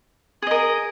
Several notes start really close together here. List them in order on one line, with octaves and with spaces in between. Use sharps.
G#4 D#5 A#4